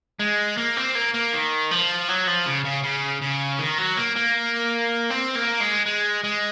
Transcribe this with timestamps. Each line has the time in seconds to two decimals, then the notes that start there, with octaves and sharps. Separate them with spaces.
0.20 G#3
0.57 A#3
0.77 C4
0.95 A#3
1.14 A#3
1.33 D#3
1.71 F3
2.08 F#3
2.27 F3
2.46 C#3
2.65 C#3
2.83 C#3
3.22 C#3
3.59 D#3
3.78 F#3
3.97 A#3
4.16 A#3
5.10 C4
5.35 A#3
5.60 G#3
5.86 G#3
6.24 G#3